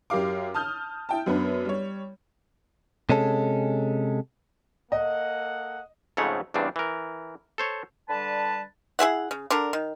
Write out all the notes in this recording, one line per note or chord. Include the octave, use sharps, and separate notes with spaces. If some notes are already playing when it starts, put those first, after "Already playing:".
F#2 G4 A#4 F5 D6
A5 D#6 F6 G6
E4 G5 A5
F#2 B3 D4 B4
G3 C#5
C3 G#3 C#4 A4
A#3 A4 D#5 F#5
F2 G#2 C#3 A3 C#5 F#5
E2 G2 C#3 C4 D4
E3 A#4
A4 C5 C#5
D3 G3 B4 A5
E4 G#4 E5 F#5
C#3
D3 D4 A#4
D#3